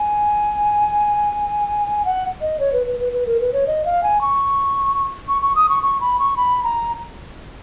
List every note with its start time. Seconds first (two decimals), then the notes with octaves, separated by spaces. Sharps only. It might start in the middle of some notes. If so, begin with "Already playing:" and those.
Already playing: G#5
2.05 F#5
2.41 D#5
2.60 C#5
2.73 B4
2.86 B4
3.00 B4
3.13 B4
3.26 A#4
3.40 B4
3.53 C#5
3.67 D#5
3.85 F5
4.03 G#5
4.21 C#6
5.28 C#6
5.42 C#6
5.56 D#6
5.69 C#6
5.83 C#6
6.01 B5
6.19 C#6
6.37 B5
6.64 A#5